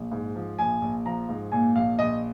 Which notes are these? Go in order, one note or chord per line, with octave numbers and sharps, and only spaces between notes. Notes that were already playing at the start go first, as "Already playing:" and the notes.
Already playing: A#1
G#2
F3
A#1 G#5
A#1
F3 A#5
G#2
A#2 G#5
A#1 F5
A#1 D#5